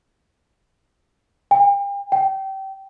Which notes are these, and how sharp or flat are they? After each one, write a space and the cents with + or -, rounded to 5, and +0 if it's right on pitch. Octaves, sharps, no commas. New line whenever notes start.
G5 +40
G5 -25